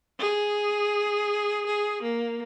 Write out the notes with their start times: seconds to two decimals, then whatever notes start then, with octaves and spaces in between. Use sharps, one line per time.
0.19 G#4
1.66 G#4
2.03 A#3